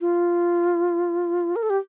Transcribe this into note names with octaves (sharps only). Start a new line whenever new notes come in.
F4
A#4
A4
G4